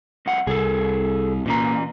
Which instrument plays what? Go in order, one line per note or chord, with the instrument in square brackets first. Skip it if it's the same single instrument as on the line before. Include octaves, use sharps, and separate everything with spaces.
[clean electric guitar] C2 F2 F#5
[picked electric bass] C2 [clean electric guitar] G#4 A4
[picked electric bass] A#2 [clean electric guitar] E3 C#4 A#5